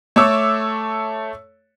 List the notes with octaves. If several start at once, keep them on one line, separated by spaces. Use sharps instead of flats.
A3 A4 C#5 D6 E6